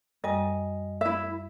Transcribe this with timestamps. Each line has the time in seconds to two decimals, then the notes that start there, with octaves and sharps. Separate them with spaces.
0.24 F#2 G3 D#5 G#5
1.01 E4 E5